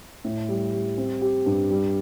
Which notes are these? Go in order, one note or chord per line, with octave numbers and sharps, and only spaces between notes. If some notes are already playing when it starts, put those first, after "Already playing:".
A2
G3
G3
C4
G4
G2
G3